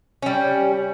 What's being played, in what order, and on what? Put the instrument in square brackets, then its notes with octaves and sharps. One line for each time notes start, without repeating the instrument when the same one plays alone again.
[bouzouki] G3 C#4